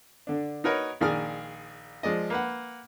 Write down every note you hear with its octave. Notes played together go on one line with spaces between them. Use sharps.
D3 D4
D#4 F#4 A#4 B4 C#5 D#5
A#1 D#3 G#4 D5 G#5 F6
F3 G#3 D5 D#5
A#3 B4 F#5